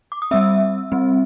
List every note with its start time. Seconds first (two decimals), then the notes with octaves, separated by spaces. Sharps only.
0.12 D6
0.22 D#6
0.31 G3 C4 E5 E6
0.92 G3 C4